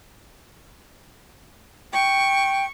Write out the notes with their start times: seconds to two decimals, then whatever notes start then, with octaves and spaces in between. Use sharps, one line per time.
1.93 G5 C#6